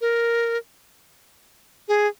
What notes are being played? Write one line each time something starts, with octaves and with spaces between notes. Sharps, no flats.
A#4
G#4